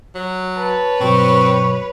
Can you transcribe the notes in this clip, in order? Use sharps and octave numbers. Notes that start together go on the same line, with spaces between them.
F#3
B4 C#5 A5
G2 B2 F#3 C4 C#6